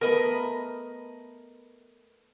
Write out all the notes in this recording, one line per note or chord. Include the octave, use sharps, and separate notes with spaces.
A3 B3 A#4 D#5 B5